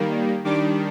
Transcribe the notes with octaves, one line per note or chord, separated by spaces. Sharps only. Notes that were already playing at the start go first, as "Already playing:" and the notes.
Already playing: D#3 G3 A#3
D#3 G3 D4 D6